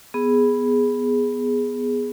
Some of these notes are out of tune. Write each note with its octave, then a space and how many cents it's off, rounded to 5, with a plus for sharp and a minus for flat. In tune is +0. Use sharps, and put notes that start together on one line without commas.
B3 +0 G#4 +0